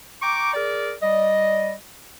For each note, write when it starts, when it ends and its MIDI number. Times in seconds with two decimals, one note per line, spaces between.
0.22 0.50 79
0.22 0.50 82
0.22 0.50 85
0.22 0.50 86
0.54 0.93 68
0.54 0.93 70
0.54 0.93 74
1.02 1.72 55
1.02 1.72 74
1.02 1.72 75